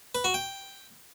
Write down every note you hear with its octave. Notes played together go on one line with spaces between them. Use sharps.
B4
F#4
G5